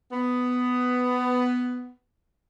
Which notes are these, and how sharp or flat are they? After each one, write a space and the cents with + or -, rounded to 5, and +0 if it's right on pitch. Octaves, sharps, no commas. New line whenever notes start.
B3 +10